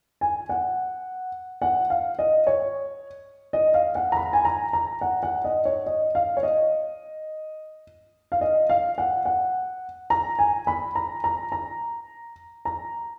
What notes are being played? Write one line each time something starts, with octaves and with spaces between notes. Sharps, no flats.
G#5
F#5
F#5
F5
D#5
C#5
D#5
F5
F#5
A#5
B5
G#5
A#5
A#5
F#5
F#5
D#5
C#5
D#5
F5
C#5
D#5
F5
D#5
F5
F#5
F#5
A#5
G#5
B5
A#5
A#5
A#5
A#5